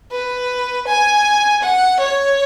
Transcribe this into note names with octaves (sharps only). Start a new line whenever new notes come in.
B4
G#5
F#5
C#5